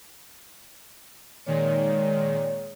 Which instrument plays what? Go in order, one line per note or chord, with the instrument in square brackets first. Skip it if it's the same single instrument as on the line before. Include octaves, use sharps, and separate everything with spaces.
[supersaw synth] A#2 D#3 G#3 [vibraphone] C#5 D5